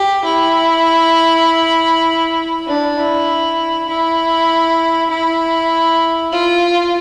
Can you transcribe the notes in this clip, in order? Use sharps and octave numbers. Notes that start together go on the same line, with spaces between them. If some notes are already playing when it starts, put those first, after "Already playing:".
Already playing: G4
E4
D4
E4
E4
E4
F4